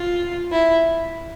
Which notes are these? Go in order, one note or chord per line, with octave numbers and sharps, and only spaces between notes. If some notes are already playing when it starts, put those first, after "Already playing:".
Already playing: F4
E4